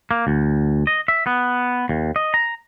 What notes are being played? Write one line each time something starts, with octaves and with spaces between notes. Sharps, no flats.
A#3
D2
D#5
E5
B3
D#2
D#5
A#5